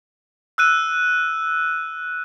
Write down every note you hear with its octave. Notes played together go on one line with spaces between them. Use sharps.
E6 F#6 D#7